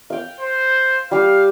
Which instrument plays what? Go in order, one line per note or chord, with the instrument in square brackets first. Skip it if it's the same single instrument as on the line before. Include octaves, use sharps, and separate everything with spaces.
[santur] F5 G5
[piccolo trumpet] C5
[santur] G3 G4 [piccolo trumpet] F5